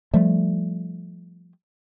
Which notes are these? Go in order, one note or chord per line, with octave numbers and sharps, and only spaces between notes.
F3 G3 A3